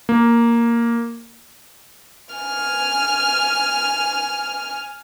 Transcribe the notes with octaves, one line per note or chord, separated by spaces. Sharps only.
A#3
G#5 F6